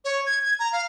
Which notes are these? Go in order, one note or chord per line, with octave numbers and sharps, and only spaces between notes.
C#5
G#6
G#6
A#5
F5